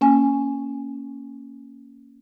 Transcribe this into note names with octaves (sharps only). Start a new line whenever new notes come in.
A#3 C#4 G#5